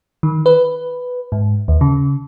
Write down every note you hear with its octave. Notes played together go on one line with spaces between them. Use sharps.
D#3
B4
G#2
D#2
C#3